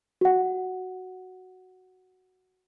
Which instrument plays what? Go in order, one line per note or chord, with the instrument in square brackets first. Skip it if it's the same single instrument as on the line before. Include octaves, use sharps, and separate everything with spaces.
[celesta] F#4 F#5